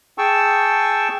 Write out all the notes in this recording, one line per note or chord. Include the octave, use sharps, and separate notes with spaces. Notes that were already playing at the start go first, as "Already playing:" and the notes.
G#4 G5 A5 C#6 E6